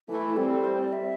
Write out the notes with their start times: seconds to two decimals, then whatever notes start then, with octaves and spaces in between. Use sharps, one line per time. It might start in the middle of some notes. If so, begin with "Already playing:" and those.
0.08 E3 A3 E4
0.36 G3 C4 A4
0.64 C5
0.79 D5
0.93 E5